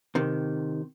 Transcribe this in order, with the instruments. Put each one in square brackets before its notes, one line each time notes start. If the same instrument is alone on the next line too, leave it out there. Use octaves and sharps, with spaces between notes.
[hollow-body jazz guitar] C3 D#3